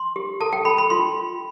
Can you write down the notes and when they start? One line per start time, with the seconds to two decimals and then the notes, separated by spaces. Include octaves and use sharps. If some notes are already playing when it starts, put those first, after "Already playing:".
Already playing: C6
0.16 G4
0.41 A4 A5
0.53 G5
0.65 A4 B5
0.78 B5
0.90 F4 C6